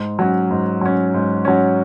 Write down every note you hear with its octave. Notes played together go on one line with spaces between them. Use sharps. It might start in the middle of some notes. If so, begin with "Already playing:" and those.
Already playing: G#2
F#3 C#4
G#2
F#3 C#4
G#2
F#3 C#4